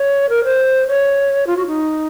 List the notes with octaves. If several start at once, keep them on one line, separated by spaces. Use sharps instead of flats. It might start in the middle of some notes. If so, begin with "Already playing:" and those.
Already playing: C#5
A#4
C5
C#5
F4
F#4
D#4